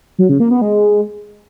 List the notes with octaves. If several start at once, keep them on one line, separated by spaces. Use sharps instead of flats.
F#3
C#3
A#3
B3
G#3